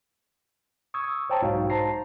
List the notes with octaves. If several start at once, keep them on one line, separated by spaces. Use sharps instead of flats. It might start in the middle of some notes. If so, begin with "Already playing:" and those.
C#6 D#6 E6 G#6
C5 C#5 G5 A5 A#5
B1 G#2 D#4 F#4 F5
C5 A5 A#5 A#6 C7